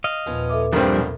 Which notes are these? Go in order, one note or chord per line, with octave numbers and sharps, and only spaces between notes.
D#5 F5
D#2 A#2 F3 B3 C#4
A4 E5 D6
A#1 G2 D#3 F3 G3 C4 D4 A#4
E2 G#2 B2